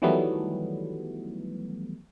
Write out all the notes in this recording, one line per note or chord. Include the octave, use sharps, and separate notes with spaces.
D#3 E3 F#3 G3 A3 B3